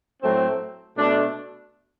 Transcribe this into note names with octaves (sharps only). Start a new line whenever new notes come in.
A2 F#3 A3 C4
B2 A3 D4